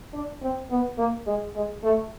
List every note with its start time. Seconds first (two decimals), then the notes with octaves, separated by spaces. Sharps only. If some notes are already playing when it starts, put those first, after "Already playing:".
0.14 D4
0.42 C4
0.70 B3
0.98 A#3
1.27 G#3
1.55 G#3
1.83 A3